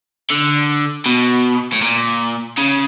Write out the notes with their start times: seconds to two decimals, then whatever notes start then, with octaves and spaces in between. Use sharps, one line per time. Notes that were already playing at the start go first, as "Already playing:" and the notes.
0.31 D3
1.06 B2
1.73 A2
1.82 A#2
2.58 C#3